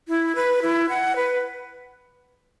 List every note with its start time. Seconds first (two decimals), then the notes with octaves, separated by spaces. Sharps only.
0.08 E4
0.36 B4
0.62 E4
0.89 F#5
1.16 B4